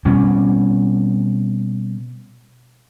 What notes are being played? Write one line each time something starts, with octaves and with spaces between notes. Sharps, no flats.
B2 G3 C4 C#4